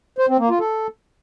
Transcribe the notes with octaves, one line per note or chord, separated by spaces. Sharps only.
C5
C4
A#3
F4
A4